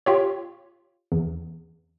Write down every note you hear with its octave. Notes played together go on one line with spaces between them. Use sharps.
F4 G4 C#5
E2